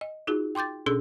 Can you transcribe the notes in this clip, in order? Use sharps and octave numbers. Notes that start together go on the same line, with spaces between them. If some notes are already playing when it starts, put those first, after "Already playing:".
D#5
D#4 F4 F#4 G#4
G5 C6 D6 G6 A6
B2 C#4 D4 G#4 A4 E6